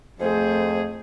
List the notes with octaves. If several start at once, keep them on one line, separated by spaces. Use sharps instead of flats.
F2 A3 G#4 C5